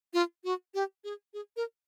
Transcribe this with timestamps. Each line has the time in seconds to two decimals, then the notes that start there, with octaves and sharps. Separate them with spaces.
0.14 F4
0.44 F#4
0.74 G4
1.04 G#4
1.34 G#4
1.56 A#4